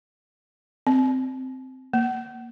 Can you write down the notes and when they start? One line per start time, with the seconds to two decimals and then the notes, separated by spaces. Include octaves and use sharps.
0.87 C4
1.93 A#3